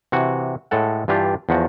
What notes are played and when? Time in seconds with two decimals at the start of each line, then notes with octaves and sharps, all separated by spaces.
0.12 C3 E3 F#4
0.71 A2 G#3 A4 F#5
1.08 G2 E3 D4 F4 G4
1.49 E2 F3 F#4